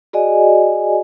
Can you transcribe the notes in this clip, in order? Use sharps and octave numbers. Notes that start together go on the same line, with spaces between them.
F#4 G#4 D5 D#5 G#5